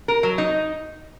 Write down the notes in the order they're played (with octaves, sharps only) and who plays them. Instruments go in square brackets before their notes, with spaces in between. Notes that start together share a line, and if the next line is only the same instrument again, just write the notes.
[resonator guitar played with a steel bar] A#4
F#3
D#4